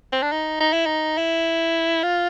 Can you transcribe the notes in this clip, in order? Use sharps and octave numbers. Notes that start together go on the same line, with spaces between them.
C4
D4
D#4
D#4
E4
D#4
E4
F4